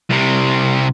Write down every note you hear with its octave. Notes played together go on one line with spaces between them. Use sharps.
C2 C3